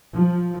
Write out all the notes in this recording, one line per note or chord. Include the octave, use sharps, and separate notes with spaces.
F3